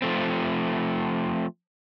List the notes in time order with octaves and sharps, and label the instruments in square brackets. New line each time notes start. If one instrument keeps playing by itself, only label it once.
[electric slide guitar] F3 A3 C4